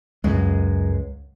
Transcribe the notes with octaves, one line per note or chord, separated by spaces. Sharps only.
C#2 F#2 G#3